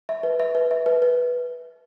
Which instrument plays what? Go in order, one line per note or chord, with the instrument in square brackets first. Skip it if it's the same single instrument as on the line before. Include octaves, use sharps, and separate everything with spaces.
[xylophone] E5
B4
E5
B4
E5
B4
B4